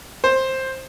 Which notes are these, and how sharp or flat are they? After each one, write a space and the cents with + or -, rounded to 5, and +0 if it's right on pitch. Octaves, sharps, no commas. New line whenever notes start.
C5 +10